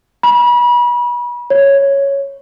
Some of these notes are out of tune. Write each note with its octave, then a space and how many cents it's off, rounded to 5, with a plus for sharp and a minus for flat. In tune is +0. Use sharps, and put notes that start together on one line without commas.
B5 -35
C#5 +0